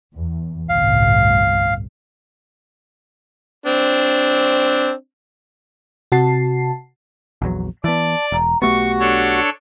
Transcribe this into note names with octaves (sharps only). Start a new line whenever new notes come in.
E2
G1 C2 A2 F5
C4 D4
C3 F#4 A5 C7
A#1 E2 F#3
E3 B3 D5 A5
E1 A#5
B1 A3 B3 F#4 G4 C#6
D4 A4 C#5